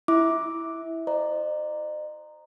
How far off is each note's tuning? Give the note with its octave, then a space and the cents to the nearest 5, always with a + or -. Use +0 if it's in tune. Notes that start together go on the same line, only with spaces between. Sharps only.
E4 +0 E5 -20 D6 +0
C5 +0 D#5 -45 A#5 +0